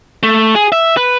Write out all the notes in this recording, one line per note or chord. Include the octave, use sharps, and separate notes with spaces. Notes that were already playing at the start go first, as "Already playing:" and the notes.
A3
G#4
E5
B4